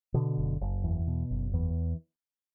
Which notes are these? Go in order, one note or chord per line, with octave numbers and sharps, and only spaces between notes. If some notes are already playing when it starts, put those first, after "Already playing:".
B2 D3
F#1
F#1
E2
B2
F#1
E2 E3